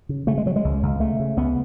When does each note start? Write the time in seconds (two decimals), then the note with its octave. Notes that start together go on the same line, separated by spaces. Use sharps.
0.09 C#3
0.27 C#3 A3
0.38 G#3
0.46 C#3 F#3
0.56 G#3
0.64 C#2
0.83 C#2
1.00 C#3 A3
1.20 C#3
1.37 C#2 B3